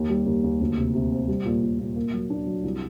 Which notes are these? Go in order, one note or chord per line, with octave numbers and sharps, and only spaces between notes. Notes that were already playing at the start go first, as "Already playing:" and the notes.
Already playing: D#2
G3
D#2
D#2
D2
C3
C3
C4
G3
A#2
A#2
A#2
A#3
F#3
D4
F#3
C2